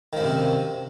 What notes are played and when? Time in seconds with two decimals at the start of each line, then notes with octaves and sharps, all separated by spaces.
0.13 D#3
0.17 F3
0.20 F#2
0.24 C3